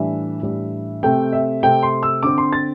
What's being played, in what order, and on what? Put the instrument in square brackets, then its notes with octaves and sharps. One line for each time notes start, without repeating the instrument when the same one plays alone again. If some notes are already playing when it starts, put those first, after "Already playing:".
Already playing: [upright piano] A2 E3 G3 D4 E5
A2 E3 G3 D4
C3 A3 C4 G5
E5
C3 A3 C4 G5
C6
E6
D3 C4 D6
C6
A6